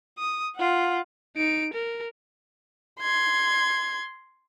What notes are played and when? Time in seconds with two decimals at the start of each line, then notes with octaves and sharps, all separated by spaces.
0.19 D#6
0.56 F4 F#5
1.36 D#4 D7
1.73 A#4
3.00 C6 G#6